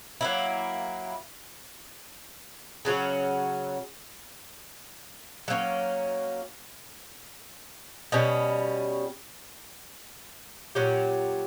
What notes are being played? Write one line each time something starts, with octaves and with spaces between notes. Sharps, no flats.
F#3 A#3 E4
C#3 F#3 C#4 F#4
F#3 A#3 C#4
B2 G3 C#4
A#2 F#3 C#4 G4